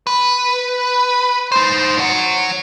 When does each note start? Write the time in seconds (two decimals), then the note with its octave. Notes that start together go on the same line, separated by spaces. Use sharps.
0.07 B4
1.52 D#4 C5
1.99 C#5 F#5